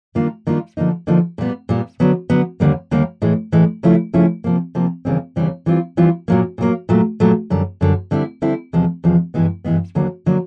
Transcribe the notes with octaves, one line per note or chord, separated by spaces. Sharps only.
D#3 G3 A#3 D4 F4
D#3 G3 A#3 D4 F4
D3 F3 A#3 D#4
D3 F3 A#3 D#4
A#2 G3 B3
A#2 G3 B3
D3 F#3 B3
D3 F#3 B3
D#2 D3 G3 A#3
D#2 D3 G3 A#3
A2 E3 G#3
A2 E3 G#3
C#3 F3 A3 C#4 E4
C#3 F3 A3 C#4 E4
C3 F3 A#3
C3 F3 A#3
D#2 C#3 E3 G3 C4
D#2 C#3 E3 G3 C4
E3 G3 C4 F4
E3 G3 C4 F4
A#2 F#3 A#3
A#2 F#3 A#3
A#2 F#3 A3
A#2 F#3 A3
F#2 D3 G3
F#2 D3 G3
D3 G3 C4 E4
D3 G3 C4 E4
E2 C3 F3 G#3
E2 C3 F3 G#3
G2 E3 G#3 B3
G2 E3 G#3 B3
D#2 D3 F#3 A#3
D3 F#3 A#3